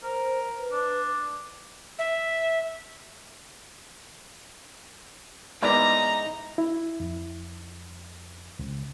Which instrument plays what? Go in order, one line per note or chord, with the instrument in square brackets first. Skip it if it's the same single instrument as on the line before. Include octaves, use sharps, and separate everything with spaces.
[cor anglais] A#4 [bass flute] C5
[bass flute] B4
[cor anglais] D4
[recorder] E5
[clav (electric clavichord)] G#2 E4 [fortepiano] B3 D5 D6 [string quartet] D#4 [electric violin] A#5
[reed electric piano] E4
F2
C#2